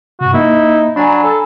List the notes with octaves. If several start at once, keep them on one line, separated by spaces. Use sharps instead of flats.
G2 C3 F#4
A#3 D#4 E4
F#3 D4 G#5 A#5 B5
A4